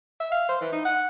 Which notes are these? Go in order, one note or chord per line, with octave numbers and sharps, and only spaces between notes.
E5
F5
C5
E3
D#4
F#5